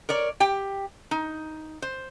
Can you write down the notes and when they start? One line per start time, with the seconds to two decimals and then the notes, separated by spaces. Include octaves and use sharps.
0.09 A#4 C#5 D5
0.40 G4 G5
1.11 D#4
1.82 C5